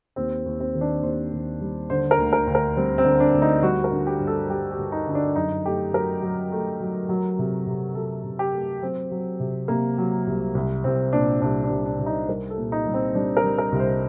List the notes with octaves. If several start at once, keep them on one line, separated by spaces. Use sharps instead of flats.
D#2 C4
D#2
C4
D#3
D4
D#2 C5
D#2
G3
D3 C5
A#4
D2
A#4
D2
A#4
G3 C4
C4
D3
D4
D2
D#4
G3 F#4
A#4
D3
G4
G2
A4
G3 G4
G4
G2
D#4
D3 D#4
D4
F#2 D#4
A3 G4
F#3 A#4
F#3
A3
F#3
F#3
C3
C3
F#3 A4
C3
G4
A3
F#3 C4
F#3
C3
C3 A#3
F#3
C2
C2
C2 C4
A#2 D4
C2 D4
D4
C2
D4
C2
D#4
G3 A#4
A4
A#2
D#4
G3
C4
G3 D4
A#4
G3
A#4
C2
C5